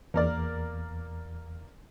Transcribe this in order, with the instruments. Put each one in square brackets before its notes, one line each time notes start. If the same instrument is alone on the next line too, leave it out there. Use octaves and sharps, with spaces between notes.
[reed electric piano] E2 [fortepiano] A#3 A#4 D5